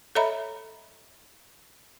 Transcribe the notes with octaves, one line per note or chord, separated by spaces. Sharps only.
A4 C#5 D#5 E5 A#5 B5